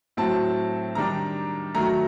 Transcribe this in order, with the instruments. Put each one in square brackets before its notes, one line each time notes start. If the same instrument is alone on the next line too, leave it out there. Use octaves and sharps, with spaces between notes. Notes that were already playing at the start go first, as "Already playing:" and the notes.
[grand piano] A2 F#3 A3 C4 A5
D#3 G3 D4 A#5
D#3 F#3 A3 A#5